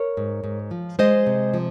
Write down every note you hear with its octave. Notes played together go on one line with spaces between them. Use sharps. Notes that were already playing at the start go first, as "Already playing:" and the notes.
Already playing: A#4 C#5
G#2
G#2
F3
G#3 C5 D#5
C3
F3